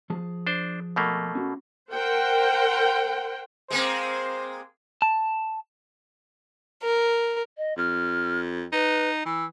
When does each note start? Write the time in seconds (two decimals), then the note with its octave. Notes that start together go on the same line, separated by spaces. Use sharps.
0.10 F3 G#4 A5
0.47 D4 C5
0.96 B2 A3 A#3
1.35 C#4 F#4
1.92 A#4 C5 F#5 G5
3.71 G#3 A#3 C4 C5
5.02 A5
6.83 A#4
7.58 D#5
7.78 F2 F6
8.72 D#4 B4
9.25 E3 E6